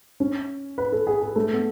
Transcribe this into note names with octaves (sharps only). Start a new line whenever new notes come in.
C#4
B4
A4
G#4
G#4
A3
B3